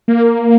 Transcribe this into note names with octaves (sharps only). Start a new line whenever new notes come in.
A#3